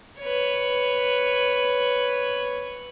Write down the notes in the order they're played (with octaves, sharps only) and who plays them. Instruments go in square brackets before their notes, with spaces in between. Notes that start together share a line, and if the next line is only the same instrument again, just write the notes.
[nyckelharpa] B4 C#5